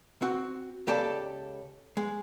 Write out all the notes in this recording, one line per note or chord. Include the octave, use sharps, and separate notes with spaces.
C4 F#4
C#2 C#3 G4 A4 D5 A5
G#3